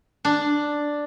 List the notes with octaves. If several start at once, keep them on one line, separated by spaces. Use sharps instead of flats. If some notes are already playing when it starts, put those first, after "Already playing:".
D4